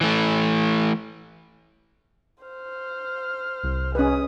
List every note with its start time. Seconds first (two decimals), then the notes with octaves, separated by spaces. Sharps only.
0.01 E3 A3
2.44 C5 F6
3.63 C2
3.95 G#3 C#4 B4 D#6